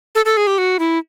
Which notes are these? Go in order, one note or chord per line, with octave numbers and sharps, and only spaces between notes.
A4
A4
G#4
G4
F#4
E4